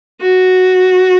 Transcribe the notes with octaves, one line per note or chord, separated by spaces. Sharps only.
F#4